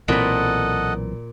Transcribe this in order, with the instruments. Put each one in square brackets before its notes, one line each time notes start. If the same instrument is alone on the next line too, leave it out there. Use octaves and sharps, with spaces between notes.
[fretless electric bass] B1 E3 C4 [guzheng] A#2 B5 [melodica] A4 D#5 F#5